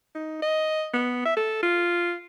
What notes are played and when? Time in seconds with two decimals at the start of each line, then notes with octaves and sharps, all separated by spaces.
0.15 D#4
0.42 D#5
0.94 B3
1.25 E5
1.37 A4
1.63 F4